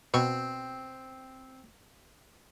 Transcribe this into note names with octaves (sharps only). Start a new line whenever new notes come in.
B2 C4 C#6